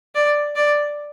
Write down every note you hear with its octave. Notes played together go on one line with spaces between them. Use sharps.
D5
D5